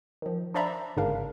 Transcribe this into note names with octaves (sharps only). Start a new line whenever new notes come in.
D#3 F3
D4 C5 D5 E5 A#5 B5
A#5
G1 G#2 C#3 D4 A#4 F5